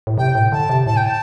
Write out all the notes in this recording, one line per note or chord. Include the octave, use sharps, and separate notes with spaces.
A2
C3 G5
A2
D3 A5
C3
A2 A5
G5
A5